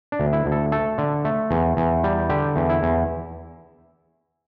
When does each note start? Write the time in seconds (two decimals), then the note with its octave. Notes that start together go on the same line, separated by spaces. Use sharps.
0.12 D4
0.20 D2
0.33 E4
0.46 D2
0.52 A4
0.72 A3 A4
0.98 D3
1.25 A3
1.51 E2
1.77 E2
2.04 G3
2.29 D3 G4
2.56 E2
2.69 E4
2.83 E2